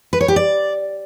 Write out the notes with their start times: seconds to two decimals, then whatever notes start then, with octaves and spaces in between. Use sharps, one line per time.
0.13 B4
0.21 C#5
0.28 G4
0.36 D5